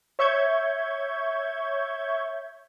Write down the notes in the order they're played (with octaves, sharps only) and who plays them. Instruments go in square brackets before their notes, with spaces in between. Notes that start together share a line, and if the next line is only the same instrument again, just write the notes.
[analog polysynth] C#5 E5 C#6 G6 G#6